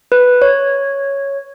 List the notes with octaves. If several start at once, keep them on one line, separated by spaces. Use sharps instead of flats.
B4
C#5